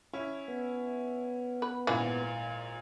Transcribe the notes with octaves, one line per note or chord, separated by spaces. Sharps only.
C#4 E4
B3
B4
G#1 A#2 E3